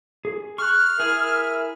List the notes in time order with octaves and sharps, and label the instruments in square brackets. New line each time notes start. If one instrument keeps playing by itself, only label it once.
[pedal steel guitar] G#4
[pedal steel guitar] C#6 F#6 [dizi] F6
[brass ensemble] E4 A#4 E5 [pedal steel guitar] G#4